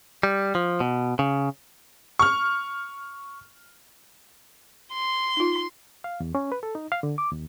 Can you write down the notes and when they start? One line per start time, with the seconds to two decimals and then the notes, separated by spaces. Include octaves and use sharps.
0.23 G3
0.55 F3
0.80 B2
1.19 C#3
2.19 C#6 F6
4.93 C6
5.37 D#4 F4
6.04 F5
6.20 E2
6.35 C#4
6.52 B4
6.63 A4
6.75 D#4
6.92 F5
7.03 D3
7.18 D6
7.32 D#2